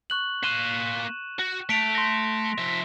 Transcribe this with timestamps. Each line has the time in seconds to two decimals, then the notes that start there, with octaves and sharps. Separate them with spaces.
0.10 C#6 F#6 F#7
0.43 A#3 C6 F#6 D#7 E7
1.39 F#4
1.69 A3 B6 D7 F7
1.95 C6 A#6
2.58 F3 E5